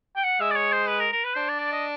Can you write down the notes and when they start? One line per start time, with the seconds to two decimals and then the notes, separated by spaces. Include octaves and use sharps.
0.16 G5
0.24 F#5
0.40 G#3 E5
0.51 D5
0.56 C#5
0.72 C5
0.88 B4
1.00 A#4
1.12 A#4
1.24 B4
1.36 D4 C5
1.49 D5
1.60 D5
1.73 D#5